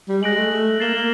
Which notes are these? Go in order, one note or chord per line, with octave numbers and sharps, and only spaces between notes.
G3
G#3 F#6 A#6 D7 F#7
A3
A3
A#3 A6 C7 E7 G7
A#3